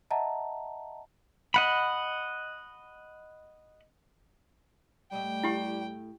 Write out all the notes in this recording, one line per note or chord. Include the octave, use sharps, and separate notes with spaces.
D#5 E5 F#5 A5 A#5
D#5 F#5 B5
A2 G3 A3 D#5 G5
E4 G4